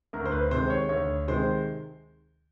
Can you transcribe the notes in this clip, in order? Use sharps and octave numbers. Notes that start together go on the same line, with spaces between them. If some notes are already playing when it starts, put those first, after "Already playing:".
D2 A#4
C5
B4
C3 D#3 G#3 C5
C#5
D2 C#5
C3 D#3 G#3 C5